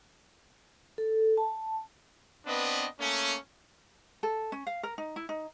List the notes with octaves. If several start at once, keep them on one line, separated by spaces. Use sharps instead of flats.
A4
A5
B3 C4 D4 B4 D#5
A3 A#3 C#4
A4
C#4
F5
A#4
D#4
E4
D#4